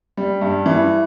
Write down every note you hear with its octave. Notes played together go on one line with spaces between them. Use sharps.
G3
G2
E3